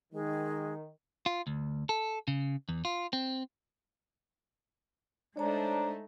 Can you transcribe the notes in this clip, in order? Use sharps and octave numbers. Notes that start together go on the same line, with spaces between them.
D#3 G#3
F4
D2
A4
C#3
E2
F4
C4
G#3 A3 D4 D#4 C5 C#5 A#5